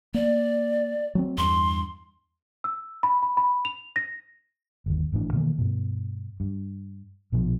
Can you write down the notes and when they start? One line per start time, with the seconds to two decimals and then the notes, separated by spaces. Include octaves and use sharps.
0.14 A#3 D5
1.15 F#3 G#3 C4
1.38 E2 G2 C6
2.64 E6
3.03 B5
3.23 B5
3.37 B5
3.65 F7
3.96 A#6
4.86 G1 D#2
5.12 G#1 A2 E3 D4
5.33 B2 D#3 E3 A#3
5.58 G2 B2
6.40 G2
7.32 A#1 B2 F3